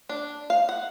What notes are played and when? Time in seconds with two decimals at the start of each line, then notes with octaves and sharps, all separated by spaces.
0.09 D4
0.50 F5
0.69 F#5